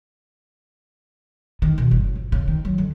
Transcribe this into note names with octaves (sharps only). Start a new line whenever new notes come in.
D#3
B2
G1
C#3
F2
C#3
D#3
F#3
D3